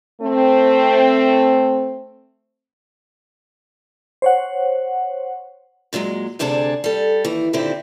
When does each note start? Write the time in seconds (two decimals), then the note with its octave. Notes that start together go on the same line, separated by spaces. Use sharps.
0.21 A3 C4
4.22 C5 C#5 F#5
5.93 A#2 D3 F#3 G#3
6.39 D2 C3 D4 G#4 A4 A5
6.84 G3 A4
7.25 D#2 E3
7.53 A#2 D3 D#3 C4 E4 G4